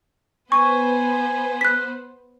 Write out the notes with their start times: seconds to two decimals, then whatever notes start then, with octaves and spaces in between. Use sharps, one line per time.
0.52 B3 B4 C5 G#5 C#6
1.61 F#6 B6